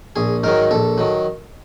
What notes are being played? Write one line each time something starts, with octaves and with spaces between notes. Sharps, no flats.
A#1 G#4
G#2 D#3 F#3 A#4
A#1 A4
D#3 F#3